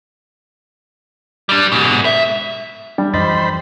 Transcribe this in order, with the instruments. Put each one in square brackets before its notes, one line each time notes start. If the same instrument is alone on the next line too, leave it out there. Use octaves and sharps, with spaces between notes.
[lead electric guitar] G3 D4
G#2 B2
E5
[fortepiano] G3 [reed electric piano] D4
[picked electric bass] F#2 E3 F3 [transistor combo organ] C5 B5 [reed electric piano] D#5 A6